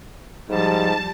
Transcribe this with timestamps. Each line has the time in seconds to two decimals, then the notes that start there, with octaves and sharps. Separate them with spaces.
0.49 G#2 F3 G3 A5